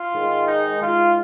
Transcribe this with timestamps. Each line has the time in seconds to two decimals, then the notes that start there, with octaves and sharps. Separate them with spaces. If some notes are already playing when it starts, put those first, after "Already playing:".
Already playing: F4
0.13 G#2 D#3 G#3
0.48 D#4
0.82 G#2 G#3 F4